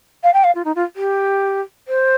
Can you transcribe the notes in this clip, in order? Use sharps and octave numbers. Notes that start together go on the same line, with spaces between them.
F5
G5
F5
F4
D#4
F4
G4
C5